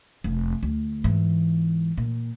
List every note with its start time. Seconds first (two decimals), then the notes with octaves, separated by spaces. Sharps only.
0.24 F1
0.63 D2
1.04 G#2 E3
1.98 A#2